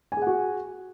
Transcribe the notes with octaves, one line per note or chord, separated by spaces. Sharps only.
F#4 G#4 F#5 G#5